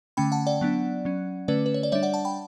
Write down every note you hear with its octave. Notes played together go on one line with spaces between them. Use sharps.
D3 A3 C#4 G5 B5
F#5 A5
D5 F#5
F#3 B3 D4
F#3 C#4
D3 A3 C#4 B4 D5
B4
C#5
D5
G3 D4 C#5 E5
D5 F#5
F#5 A5
G5 B5